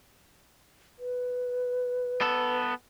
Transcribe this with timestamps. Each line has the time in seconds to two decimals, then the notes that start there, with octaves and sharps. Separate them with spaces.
0.99 B4
2.21 B3 A4